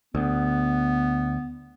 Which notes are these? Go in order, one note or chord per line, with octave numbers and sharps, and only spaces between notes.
D2 B3